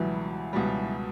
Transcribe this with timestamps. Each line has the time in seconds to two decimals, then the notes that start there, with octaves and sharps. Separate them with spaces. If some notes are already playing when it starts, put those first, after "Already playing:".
Already playing: C#2 B2 E3 F#3 G3
0.53 C#2 B2 G3